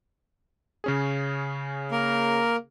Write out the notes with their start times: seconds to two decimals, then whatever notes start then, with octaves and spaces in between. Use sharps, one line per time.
0.84 C#3 C#4 G#4
1.91 A#3 A#4